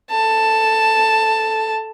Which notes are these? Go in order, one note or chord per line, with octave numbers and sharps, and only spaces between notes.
A4 A5